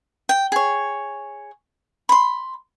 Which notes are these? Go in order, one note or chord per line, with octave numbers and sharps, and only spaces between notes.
G5
G#4 C#5
B5 C6